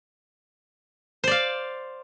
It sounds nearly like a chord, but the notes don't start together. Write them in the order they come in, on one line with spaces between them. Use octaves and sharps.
C5 D5 F5